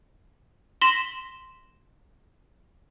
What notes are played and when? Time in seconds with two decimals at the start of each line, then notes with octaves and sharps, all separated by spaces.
0.81 C6 A#6 B6 E7 F#7